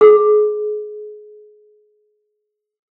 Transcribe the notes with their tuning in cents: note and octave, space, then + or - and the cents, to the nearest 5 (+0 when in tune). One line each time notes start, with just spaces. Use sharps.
G#4 +25